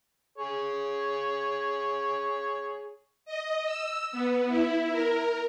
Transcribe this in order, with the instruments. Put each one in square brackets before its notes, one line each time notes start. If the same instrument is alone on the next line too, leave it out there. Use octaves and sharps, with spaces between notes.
[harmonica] G#4 C#5
[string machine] D#5
E6
B3
E4
A#4